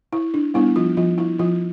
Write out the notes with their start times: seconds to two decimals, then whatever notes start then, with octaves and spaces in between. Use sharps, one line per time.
0.13 E4
0.34 D4
0.54 G3 B3 D4 E4
0.76 F3 F4
0.97 F3 F4
1.18 E4
1.39 F3 F4